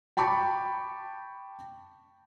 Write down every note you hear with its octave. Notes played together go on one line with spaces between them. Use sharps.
G5 A5 B5 C#6 D6